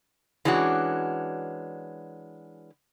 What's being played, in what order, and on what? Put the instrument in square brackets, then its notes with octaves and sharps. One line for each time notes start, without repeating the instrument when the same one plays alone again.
[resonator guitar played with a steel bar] E3 G#3 C#4 D4 F#4